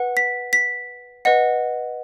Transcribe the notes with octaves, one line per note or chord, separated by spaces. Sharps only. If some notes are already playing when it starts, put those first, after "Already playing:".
Already playing: B4 F#5
B6
B6
B4 D#5 F#5